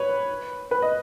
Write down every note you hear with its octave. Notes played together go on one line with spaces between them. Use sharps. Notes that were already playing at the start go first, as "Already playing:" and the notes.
Already playing: B4 C#5
B4
D#5